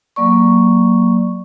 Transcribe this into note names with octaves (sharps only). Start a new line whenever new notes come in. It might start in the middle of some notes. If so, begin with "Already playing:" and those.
F#3 A#3 D5 C#6